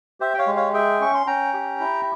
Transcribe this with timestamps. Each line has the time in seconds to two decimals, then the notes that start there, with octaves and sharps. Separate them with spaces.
0.20 G4 C5 E5
0.34 G5
0.38 C#5 F5
0.47 G#3
0.56 C#5 F5
0.73 G#4 E5 G5
1.00 C#4 C#6
1.15 C6
1.27 C#4 G5 A#5
1.54 G4
1.80 E4